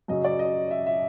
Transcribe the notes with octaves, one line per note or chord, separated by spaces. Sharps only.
F#2 C#3 F#3 D#5
D5
D#5
E5
E5